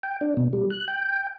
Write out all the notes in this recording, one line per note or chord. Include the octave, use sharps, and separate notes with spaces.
G5
D4
B2
G3
F#6
G5